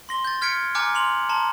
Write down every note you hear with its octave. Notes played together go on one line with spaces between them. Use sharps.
C6 A#6 G7
G6 A6
F6 G#6 B6 C#7 D7
G#5 A#5 D6 F6 F#6 C#7
C6 F7 F#7
A5 A#5 C6